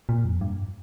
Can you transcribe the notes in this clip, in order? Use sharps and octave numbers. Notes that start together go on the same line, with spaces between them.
A#2
F2
G2